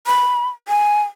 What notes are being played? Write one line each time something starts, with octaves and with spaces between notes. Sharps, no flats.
B5
G#5